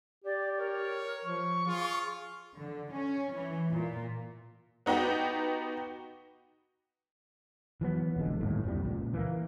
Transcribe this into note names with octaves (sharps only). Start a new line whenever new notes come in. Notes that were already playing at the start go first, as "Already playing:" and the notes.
G4 D5
A#4 C#5
F3 C#6
F4 G#4
D3
C#4
E3
A#2
B3 D#4 F#4 G4
E3 F#3 B3
E1 A#1 D3 G#3
G1 D#2 A2
A#1 F2 D#3 G3
C#2 A#2
E3 A#3